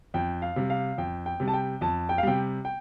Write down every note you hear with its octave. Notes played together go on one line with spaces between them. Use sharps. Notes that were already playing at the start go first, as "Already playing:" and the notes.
F2 G5
F5
C3 G3
F5
F2 G5
G5
C3 G3
A5
G5
F2 A5
G5
F5
C3 G3 G5
G5